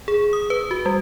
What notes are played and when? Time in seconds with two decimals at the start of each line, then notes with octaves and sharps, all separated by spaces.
0.08 G#4
0.33 D#6
0.50 B4
0.71 F#4
0.86 G3